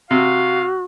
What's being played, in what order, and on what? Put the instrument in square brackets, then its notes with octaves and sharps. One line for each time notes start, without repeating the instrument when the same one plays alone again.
[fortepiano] C3 [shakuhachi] F#4 [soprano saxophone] F5